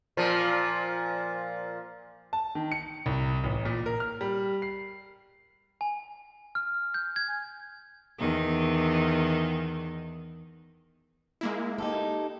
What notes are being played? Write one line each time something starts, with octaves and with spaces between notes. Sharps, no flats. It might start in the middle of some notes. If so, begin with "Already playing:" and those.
A#2 F3
A5
D#3
C#7
C2
A1
A#2
A#4
F6
G3
C7
G#5
F6
G6
G#6
E2 D#3 D#4
G#3 A#3 E4
D#4 G4 A4